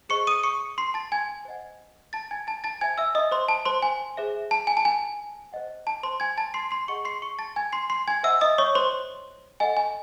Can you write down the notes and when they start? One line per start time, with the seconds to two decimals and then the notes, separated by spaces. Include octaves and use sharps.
0.09 G#4 C5 D#5 C#6 C#7
0.27 D#6 D#7
0.43 C#6 C#7
0.78 C6 C7
0.94 A5 A6
1.12 G#5 G#6
1.45 C5 D#5 F#5
2.13 A5 A6
2.31 G#5 G#6
2.47 A5 A6
2.64 A5 A6
2.81 C5 E5 G#5 G#6
2.98 E5 E6
3.15 D#5 D#6
3.32 C5 C6
3.48 A5
3.65 C5 C6
3.82 G#5
4.17 G#4 C5 E5
4.51 A5
4.67 G#5
4.77 A5
4.85 G#5
5.53 C5 D#5 F#5
5.87 A5
6.03 C5 C6
6.20 G#5 G#6
6.37 A5 A6
6.54 C6 C7
6.71 C6 C7
6.88 G#4 D#5 F#5 C#6 C#7
7.05 C6 C7
7.22 C#6 C#7
7.39 A5 A6
7.56 G#5 G#6
7.72 C6 C7
7.90 C6 C7
8.08 G#5 G#6
8.23 C5 D#5 E5 F#5 E6
8.41 D#5 D#6
8.58 C#5 C#6
8.75 C5 C6
9.60 A4 D#5 F#5 G#5
9.77 G#5